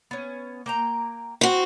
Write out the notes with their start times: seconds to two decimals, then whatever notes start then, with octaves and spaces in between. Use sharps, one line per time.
0.11 B3 C#4
0.66 A#3 G5 A#5
1.41 C4 F#4